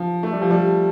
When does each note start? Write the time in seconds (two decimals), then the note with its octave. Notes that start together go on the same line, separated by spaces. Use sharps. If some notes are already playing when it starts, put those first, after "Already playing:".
Already playing: F3
0.23 A3
0.33 G3
0.42 F3
0.51 G3